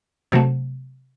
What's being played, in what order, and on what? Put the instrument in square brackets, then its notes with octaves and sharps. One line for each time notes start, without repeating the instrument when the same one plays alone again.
[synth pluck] C3 F#3 A3